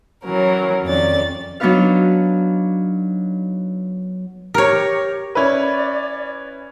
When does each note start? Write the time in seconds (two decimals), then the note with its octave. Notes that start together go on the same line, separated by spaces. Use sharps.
0.25 E3 F#3 C#4 A#4
0.85 F2 D#3 C#4 D5 A6
1.60 F#3 B3 D4 D#4 B4 F5
4.54 G4 A#4 C#5
5.35 C#4 E4 B4 D5